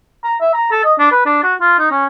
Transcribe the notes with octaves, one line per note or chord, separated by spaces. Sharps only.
A#5
E5
A#5
A4
D#5
D4
B4
D4
F#4
F4
D#4
C#4